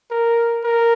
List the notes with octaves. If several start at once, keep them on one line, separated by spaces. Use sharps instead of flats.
A#4
A#4